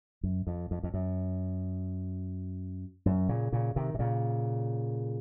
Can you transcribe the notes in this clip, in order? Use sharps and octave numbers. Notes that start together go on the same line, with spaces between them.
F#2
F2
F2
F2
F#2
F#2
A#2 C#3
A#2 C#3
C3 D#3
C3
A#2 C#3